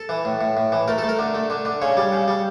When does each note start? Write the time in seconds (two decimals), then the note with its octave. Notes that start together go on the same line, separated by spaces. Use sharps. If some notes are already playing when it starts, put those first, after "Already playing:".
Already playing: A4
0.09 E3
0.25 A2
0.41 A2
0.57 A2
0.72 E3
0.88 A3 A#4
0.98 A4
1.04 A3
1.09 A#4
1.19 D3
1.35 A3
1.50 D3
1.65 D3
1.82 C#3 C#5
1.97 G3
2.12 C#3
2.28 G3